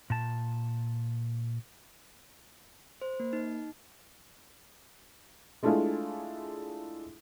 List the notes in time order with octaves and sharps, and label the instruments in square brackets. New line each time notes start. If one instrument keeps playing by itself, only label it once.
[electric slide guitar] A#2 A5
[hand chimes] C5
A#3
D#4
[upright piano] G#3 A3 D4 E4 F4 G#4